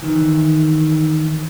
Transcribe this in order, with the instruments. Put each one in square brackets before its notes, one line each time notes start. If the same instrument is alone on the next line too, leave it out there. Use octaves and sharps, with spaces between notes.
[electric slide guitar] D#3 E3